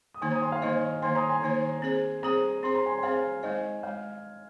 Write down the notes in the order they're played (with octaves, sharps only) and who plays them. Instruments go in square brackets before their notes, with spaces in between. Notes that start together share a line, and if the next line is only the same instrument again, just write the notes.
[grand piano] D#6
[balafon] D#3 A#3 D#4 C5 [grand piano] G#5 C6
[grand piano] A#5 D#6
G#5 C6
F5
[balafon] D#3 A#3 D#4 C5 [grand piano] D#5 G#5
[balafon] D#3 A#3 D#4 C5 [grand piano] G#5 C6
[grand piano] A#5 D#6
G#5 C6
[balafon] D#3 A#3 D#4 C5
C4 G#4 C5
[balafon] C4 G#4 C5 [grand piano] A#5 D#6
[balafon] C4 G#4 C5 [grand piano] C6
[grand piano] A#5
G#5 C6
G#5
[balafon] C4 G#4 C5 [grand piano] F5 A#5
[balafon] G#3 D#4 C5 [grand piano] D#5 G#5
[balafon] G#3 [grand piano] F5